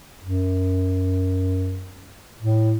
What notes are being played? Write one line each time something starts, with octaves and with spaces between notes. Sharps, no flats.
F#2
A2